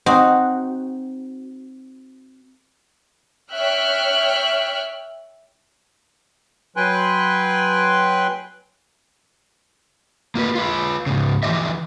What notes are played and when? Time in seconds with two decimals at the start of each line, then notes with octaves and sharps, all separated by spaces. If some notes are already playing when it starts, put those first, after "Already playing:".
0.06 C4 D#4 F#4
3.51 C#5 E5 G5 F6 F#6
6.76 F#3 B4 G5 G#5 C6 F#6
10.35 A#3 F4 B4
10.55 F4 B4
11.06 G#2 C#3
11.43 E3 F3 B3 G4 D#5 E5